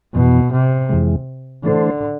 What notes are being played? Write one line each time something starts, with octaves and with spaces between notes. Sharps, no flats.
F2 B2 E3 B3
C3
F2 E3 G#3
D3 E3 A3 D4 A4 C5